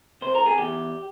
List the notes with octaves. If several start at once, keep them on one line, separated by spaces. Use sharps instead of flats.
C3 C5
A#4
G#4
E2 G4